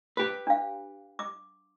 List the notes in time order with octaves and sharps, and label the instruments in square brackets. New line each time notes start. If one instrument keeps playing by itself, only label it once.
[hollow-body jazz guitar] G4 B4
[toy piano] D4 F5
D6